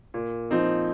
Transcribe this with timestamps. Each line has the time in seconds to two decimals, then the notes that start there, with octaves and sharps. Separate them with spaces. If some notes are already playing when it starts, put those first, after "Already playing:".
0.14 A#2
0.51 F3 C4 D#4